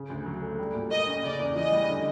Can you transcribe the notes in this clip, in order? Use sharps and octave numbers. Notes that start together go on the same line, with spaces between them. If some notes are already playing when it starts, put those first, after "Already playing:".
Already playing: C#3
D2
F#3
A3
G3
A#2
A#3 D#5
C#4
C#3 D5
E2
E3 D#5
G3
D3